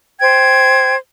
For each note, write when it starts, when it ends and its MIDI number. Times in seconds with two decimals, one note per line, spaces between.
0.19 0.95 72
0.19 0.95 79
0.19 0.95 92